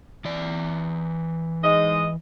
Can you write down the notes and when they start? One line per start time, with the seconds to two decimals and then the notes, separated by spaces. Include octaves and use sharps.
0.25 E3 D5
1.63 G#2 G#3 D#5